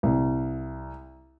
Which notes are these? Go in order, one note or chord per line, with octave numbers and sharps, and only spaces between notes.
C2